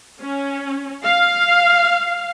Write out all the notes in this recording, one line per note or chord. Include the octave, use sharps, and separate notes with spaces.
C#4
F5